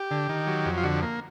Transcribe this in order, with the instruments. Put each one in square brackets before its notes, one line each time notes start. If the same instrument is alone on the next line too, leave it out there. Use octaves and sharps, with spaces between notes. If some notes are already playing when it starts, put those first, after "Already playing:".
Already playing: [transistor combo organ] G4
D3
D#3
F#3
F2
F4
D3 F#4
A#3